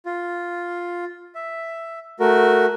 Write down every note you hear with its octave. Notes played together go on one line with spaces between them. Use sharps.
F4
E5
A3 F#4 A#4